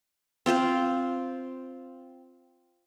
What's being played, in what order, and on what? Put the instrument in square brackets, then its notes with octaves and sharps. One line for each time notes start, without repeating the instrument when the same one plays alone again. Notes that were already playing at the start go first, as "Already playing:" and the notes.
[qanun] C4 F4 C5 F5